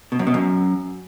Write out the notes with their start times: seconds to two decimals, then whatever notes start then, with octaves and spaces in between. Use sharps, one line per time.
0.12 B2
0.19 F#2
0.27 B2
0.34 F#2